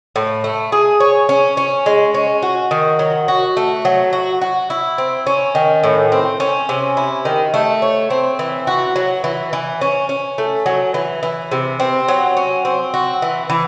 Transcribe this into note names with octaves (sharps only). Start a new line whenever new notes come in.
A2
A3
G#4
C#5
C#4
C#4
G#3
C#4
F#4
D#3
F#3
F#4
A3
F#3
F#4
F#4
E4
C4
C#4
D#3
A2
C4
C#4
C3
E4
D#3
A3
C#5
C4
E3
F#4
F#3
E3
E3
C#4
C#4
A3
F#3
E3
E3
C3
C4
F#3
C#4
C4
F#4
E3
E3